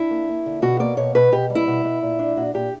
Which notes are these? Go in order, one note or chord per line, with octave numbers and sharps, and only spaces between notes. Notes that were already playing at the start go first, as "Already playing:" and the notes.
Already playing: D4 E4
A#3
A#3
D3
B2 F#4
A#3 D5
B2 C#5
B2 B4
B2 G4
G3
E4
B2
B2
A#2
D4
A#2 F#4
A#2 G4